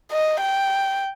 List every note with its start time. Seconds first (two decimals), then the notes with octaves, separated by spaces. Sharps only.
0.12 D#5
0.41 G5